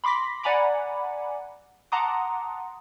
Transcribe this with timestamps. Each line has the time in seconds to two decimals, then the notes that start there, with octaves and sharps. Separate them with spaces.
0.04 B5 C6 D6 A#6 B6
0.43 D5 F#5 G#5 A#5 B5 D6
1.92 F#5 A5 A#5 C6 D6 D#6